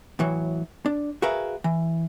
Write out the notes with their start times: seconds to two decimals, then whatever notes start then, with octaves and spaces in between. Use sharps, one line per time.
0.19 A2 E3 F#3
0.86 D4
1.22 F#4 G#4 A#4 B4 E5 F5
1.64 E3